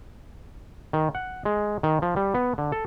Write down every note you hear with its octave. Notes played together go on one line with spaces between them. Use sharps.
D#3
F#5
G#3
D#3
F3
G3
B3
D3
A4